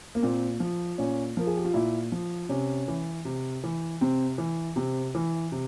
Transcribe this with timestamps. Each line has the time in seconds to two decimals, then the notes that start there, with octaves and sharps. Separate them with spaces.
0.15 A#3
0.23 A#2 C4
0.60 F3
0.98 A#2 C#4
1.37 F3 A#4
1.47 G#4
1.57 G4
1.65 F4
1.74 A#2 E4
2.12 F3
2.49 C3 C#4
2.88 E3
3.25 C3
3.64 E3
4.01 C3 C4
4.38 E3
4.76 C3 C4
5.15 E3
5.52 C3